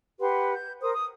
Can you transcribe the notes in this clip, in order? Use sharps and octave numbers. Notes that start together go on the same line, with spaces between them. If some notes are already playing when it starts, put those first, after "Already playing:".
G4 B4 F#5 C6
G6
A#4 C5 D#6
D#6